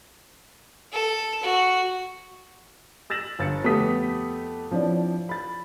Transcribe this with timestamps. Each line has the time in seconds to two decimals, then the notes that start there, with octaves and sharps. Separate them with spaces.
0.92 A4
1.43 F#4
3.10 E6 A6 A#6 E7 F#7
3.39 G1 A6 C#7
3.64 F2 A3 B3 G4 D#6 B6
4.71 F3 C4 D4 E4 C#5 D5
5.29 B5 A6